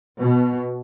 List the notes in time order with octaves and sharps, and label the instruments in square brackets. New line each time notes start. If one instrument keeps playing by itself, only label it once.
[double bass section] B2